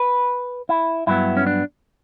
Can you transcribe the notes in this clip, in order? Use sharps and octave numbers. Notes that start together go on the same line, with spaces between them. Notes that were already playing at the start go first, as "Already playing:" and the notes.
Already playing: B4
E4
G2 F#3 B3 E4
C#4
D4